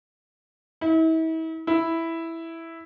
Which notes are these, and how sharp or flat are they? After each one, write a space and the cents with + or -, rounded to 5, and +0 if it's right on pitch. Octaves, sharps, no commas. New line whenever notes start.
E4 -40
E4 +0